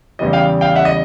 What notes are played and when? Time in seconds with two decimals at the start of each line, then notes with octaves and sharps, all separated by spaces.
0.19 E2 C#3 E3 G3 D#5
0.33 F5 G5
0.61 F5 G5
0.76 E5 F#5
0.85 D#5